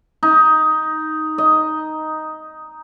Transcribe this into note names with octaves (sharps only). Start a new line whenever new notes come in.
D#4
D#5